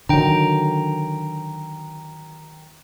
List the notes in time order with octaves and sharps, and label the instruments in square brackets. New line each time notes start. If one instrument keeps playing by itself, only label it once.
[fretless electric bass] D3 D#3 F#3 [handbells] G5 A#5